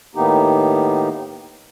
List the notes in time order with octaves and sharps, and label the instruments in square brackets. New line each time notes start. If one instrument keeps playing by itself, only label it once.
[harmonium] A2 D#3 A#3 B3 D#4 G4